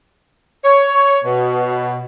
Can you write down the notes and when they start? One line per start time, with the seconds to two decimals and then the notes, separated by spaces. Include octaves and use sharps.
0.65 C#5
1.25 B2